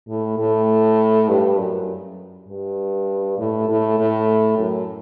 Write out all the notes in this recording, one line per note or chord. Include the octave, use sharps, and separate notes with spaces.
A2
A2
G2
F#2
G2
A2
A2
A2
F#2